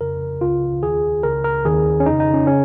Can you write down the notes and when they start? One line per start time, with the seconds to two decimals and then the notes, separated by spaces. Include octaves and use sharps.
0.01 F2 C#3 A#4
0.41 C#2 C#3 F4
0.83 D#2 D#3 G#4
1.23 C#2 C#3 A#4
1.44 A#4
1.65 D#2 D#3 G#4
2.00 C#4
2.06 F2 C#3 D#4
2.20 D#4
2.34 C#4
2.47 C#3 C#4